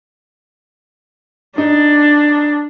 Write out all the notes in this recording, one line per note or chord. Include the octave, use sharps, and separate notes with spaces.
D4 D#4